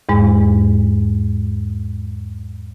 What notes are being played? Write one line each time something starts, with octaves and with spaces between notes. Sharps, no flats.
E2 G#2 G#3